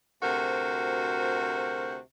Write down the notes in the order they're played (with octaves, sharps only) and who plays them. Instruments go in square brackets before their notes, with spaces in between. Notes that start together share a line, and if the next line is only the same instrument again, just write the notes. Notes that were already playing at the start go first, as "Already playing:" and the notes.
[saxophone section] D2 C3 F#4 A#4 C5